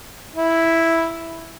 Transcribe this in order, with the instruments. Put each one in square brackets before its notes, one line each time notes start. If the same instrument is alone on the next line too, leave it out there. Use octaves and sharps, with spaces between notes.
[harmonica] E4